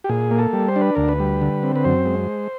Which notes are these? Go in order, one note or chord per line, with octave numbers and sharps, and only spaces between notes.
G4
A#2 G#4
A#3
A4
G3
C5
D4
B4
D2 A#4
B4
G3
D3
C4
B4
F#2 C5
G#3